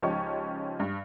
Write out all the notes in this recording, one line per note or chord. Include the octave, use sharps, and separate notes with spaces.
C#2 F3 C#4 D#4 G4 C#6
G2